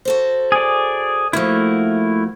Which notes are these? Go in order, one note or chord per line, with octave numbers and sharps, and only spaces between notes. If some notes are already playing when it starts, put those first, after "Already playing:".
F#4 A4 C5
G#4 D5
F3 A3 A#3 E4 F#4